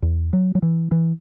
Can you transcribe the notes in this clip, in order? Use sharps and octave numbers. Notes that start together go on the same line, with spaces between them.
E2
F#3
F#3
E3
E3